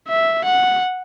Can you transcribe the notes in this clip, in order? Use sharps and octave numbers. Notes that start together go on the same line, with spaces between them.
E5
F#5